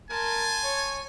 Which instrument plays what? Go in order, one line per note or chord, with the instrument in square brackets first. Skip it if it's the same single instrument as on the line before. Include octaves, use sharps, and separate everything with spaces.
[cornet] A#4 [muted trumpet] G#5 [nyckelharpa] A5 C6
[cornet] C#5